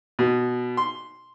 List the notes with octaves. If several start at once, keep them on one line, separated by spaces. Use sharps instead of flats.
B2
C6